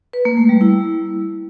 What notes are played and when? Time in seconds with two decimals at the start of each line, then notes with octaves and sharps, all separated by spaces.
0.13 B4
0.25 A#3
0.37 A3
0.49 G3
0.61 E4